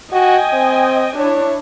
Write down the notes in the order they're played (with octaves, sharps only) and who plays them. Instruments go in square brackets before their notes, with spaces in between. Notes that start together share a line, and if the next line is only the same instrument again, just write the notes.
[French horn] F#4 [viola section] D#5 G5 G#5
[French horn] C4
[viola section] D4 E4 [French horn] C#5